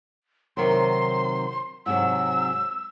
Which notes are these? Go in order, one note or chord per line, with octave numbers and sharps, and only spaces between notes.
C3 D#3 F#3 C6
G#2 C3 F#3 E6